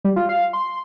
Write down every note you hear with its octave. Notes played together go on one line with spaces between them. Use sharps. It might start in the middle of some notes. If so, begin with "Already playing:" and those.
G3
F4
F5
C6